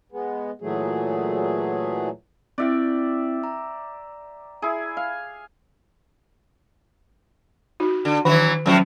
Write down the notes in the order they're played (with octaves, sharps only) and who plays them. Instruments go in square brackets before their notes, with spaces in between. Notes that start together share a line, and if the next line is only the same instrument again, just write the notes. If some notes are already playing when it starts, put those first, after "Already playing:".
[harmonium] G#3 B3
A#2 E3 F#3 A3 G#4
[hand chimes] C4 E4 [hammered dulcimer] D5 E5 G5
[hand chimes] A#5
[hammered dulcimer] E4 G#4
F5
[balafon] D#4 F#4
[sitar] D3
[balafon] D#3 [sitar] E3 F#3 F#4
[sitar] A2 F3 F#4 [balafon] F#3 C#4